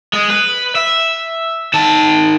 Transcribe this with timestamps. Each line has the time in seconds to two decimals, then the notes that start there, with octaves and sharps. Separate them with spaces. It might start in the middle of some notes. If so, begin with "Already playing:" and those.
0.13 G#3
0.30 B4
0.75 E5
1.74 D#3 A5